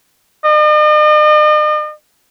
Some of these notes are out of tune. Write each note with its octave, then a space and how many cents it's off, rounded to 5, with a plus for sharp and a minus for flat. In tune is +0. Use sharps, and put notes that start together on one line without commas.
D#5 -45